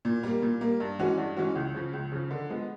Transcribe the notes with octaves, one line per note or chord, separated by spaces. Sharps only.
A#2
G3 A#3
A#2
G3 A#3
G2
E3 G#3 C#4 F#4
G2
E3 G#3 C#4 F#4
C#2
C#3 F3
C#2
C#3 F3
D3
F3 G#3 B3